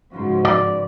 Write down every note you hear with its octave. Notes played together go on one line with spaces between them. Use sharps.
G#2 C#3 F3 F#4 B4 C5
D5